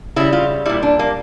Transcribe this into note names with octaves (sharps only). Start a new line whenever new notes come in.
C#3 G3 E4
F4
A#2 G3 E4
D4
A#3